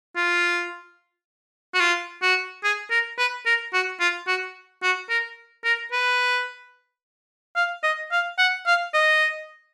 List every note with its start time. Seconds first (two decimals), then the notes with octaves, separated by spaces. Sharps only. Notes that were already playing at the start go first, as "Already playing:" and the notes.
0.16 F4
1.75 F#4
1.80 F4
2.22 F#4
2.64 G#4
2.91 A#4
3.18 B4
3.46 A#4
3.73 F#4
4.00 F4
4.27 F#4
4.83 F#4
5.10 A#4
5.64 A#4
5.92 B4
7.56 F5
7.83 D#5
8.12 F5
8.38 F#5
8.66 F5
8.94 D#5